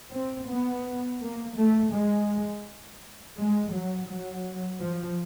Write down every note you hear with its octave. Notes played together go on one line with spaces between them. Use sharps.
C4
B3
A#3
A3
G#3
G#3
F#3
F#3
F3